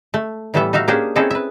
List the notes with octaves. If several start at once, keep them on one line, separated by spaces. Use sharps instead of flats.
A3
A2 E3 G3 B3 A4 E5
D#4 F#4 E5 F5
A#3 C#4 D4 G4 G#4 C5
C4 C#4 D#4 E4 G#4 A4
B4 E5